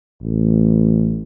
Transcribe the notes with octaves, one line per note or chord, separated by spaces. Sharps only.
A1